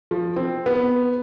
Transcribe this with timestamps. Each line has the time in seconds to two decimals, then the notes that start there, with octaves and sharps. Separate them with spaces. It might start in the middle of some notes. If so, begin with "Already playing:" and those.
0.11 F3
0.36 C4
0.66 B3